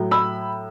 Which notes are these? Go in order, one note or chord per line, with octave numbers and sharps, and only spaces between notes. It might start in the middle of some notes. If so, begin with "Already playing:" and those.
Already playing: A2 F#3
B5 E6